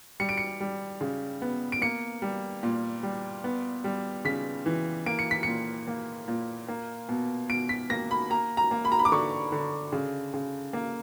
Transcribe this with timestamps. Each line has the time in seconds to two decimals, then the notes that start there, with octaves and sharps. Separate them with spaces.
0.20 G3 C#7
0.29 D7
0.37 C#7
0.60 G3
1.01 C#3
1.42 B3
1.72 D7
1.82 A#3 C#7
2.22 G3
2.63 A#2
3.03 G3
3.44 B3
3.84 G3
4.25 C#3 B6
4.66 E3
5.06 A#3 D7
5.19 C#7
5.31 B6
5.43 A#2 C#7
5.88 A#3
6.28 A#2
6.68 A#3
7.09 B2
7.49 B2 D7
7.69 B6
7.90 A#3 A#6
8.11 B5
8.30 A#3 A#5
8.57 A#5
8.71 A#3
8.85 B5
8.92 A#5
8.99 B5
9.05 D6
9.12 D3 C#6
9.52 D3
9.93 C#3
10.34 C#3
10.73 A#3